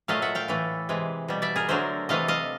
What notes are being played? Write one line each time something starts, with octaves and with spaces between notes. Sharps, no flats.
A#2 F#3 A3 D#5 F5
E5 F#5
F5 G5
A2 E3 A3
C3 E3 G#3
B2 G3
D5 E5
G#4 A#4
D3 F#3 A3 A#4 C5
C3 E3 A3 D#5 F5
D#5 F5